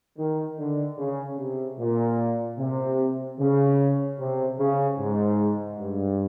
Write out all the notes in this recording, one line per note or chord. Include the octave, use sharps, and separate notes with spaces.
D#3
D3
C#3
C3
A#2
C3
C#3
C3
C#3
G#2
G2